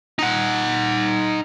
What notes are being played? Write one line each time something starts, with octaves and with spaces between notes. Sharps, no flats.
D#4 F#5